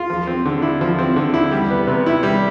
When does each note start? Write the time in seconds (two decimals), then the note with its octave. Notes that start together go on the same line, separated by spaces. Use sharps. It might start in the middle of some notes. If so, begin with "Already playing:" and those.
Already playing: F4
0.10 F3
0.27 C4
0.45 D3
0.62 E4
0.81 F3
0.99 C4
1.16 D3
1.34 E4
1.52 G3
1.70 B3
1.87 C3
2.06 E4
2.23 G3